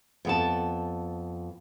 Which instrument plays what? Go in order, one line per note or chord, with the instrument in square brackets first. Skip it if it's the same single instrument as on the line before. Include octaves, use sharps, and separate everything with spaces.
[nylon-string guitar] F2 B3 A5